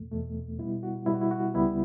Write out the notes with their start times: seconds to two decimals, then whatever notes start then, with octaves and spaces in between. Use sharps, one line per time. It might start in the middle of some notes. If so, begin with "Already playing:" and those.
Already playing: E2 B2 A3
0.11 E2 B2 A3
0.59 B2 G3 B3 E4
0.83 F#4
1.06 B2 G3 B3 E4
1.14 F#4
1.21 E4
1.31 F#4
1.54 C#2 C#3 G3 B3 E4